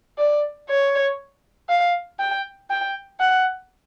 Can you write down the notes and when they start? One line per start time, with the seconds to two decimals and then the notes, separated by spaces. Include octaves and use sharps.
0.18 D5
0.69 C#5
1.69 F5
2.20 G5
2.70 G5
3.20 F#5